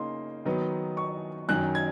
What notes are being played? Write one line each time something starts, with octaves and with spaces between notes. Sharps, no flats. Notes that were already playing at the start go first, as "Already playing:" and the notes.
Already playing: C#3 A#3 D#4 C6
D#3 F#3 B3 D#4
C#6
F#2 D#3 F#3 F#6
G#6